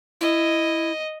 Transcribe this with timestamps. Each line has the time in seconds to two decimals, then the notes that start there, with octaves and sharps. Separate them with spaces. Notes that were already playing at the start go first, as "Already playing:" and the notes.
0.21 E4 D#5